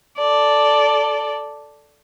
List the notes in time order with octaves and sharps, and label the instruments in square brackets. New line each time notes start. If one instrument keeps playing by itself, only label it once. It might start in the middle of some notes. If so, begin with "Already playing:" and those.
[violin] A4 D5